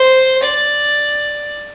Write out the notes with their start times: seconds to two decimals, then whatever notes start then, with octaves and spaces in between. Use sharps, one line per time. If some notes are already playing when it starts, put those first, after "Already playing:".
Already playing: C5
0.43 D5